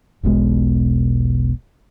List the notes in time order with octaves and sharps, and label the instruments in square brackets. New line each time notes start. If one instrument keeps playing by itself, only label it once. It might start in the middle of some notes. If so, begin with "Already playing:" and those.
[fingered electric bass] E1 B1 B2 G#3